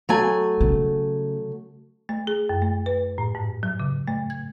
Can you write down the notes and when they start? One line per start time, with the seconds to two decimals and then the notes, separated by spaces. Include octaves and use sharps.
0.09 F#3 A3 G#5
0.61 C#3
2.09 A3
2.27 G#4
2.49 F#2
2.62 A3
2.86 B4
3.18 A2
3.35 G#2
3.63 F#3
3.80 C#3
4.07 A3
4.30 G#6